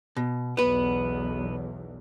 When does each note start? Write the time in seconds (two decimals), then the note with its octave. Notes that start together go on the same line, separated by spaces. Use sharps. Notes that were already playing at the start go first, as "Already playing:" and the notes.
0.17 B2
0.57 B1 E2 B3 B4